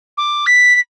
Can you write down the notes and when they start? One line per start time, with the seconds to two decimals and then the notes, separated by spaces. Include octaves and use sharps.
0.18 D6
0.46 B6
0.75 B6